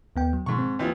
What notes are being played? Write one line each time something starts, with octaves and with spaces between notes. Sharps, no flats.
D#2 B3 G5
F#3
G#2 B2 D#3 F3 C#6
C4
D#2 E3 F3